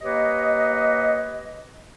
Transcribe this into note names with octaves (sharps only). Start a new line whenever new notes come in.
A#3 G4 B4 C#5 D#5